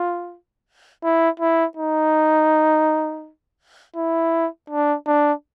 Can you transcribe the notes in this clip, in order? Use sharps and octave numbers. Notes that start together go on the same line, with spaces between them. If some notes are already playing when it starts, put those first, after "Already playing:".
Already playing: F4
E4
E4
D#4
E4
D4
D4